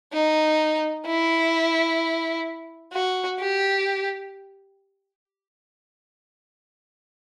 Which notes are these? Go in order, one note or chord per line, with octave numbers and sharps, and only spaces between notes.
D#4
E4
F#4
G4